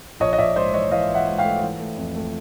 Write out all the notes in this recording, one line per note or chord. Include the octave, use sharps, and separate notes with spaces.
A#1 C#5 D#5
D#5
A#1 D5 E5
G#2 C5 D5
E3 C#5 D#5
E3 D#5 F5
E3
E5 F#5
G#2
F5 G5
A3
E3
A3
F2
A3